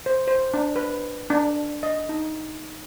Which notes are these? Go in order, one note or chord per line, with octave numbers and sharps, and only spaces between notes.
C5
C5
D4
B4
D4
D#5
D#4